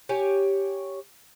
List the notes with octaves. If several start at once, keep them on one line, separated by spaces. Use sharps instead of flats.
G4 C#5 G#5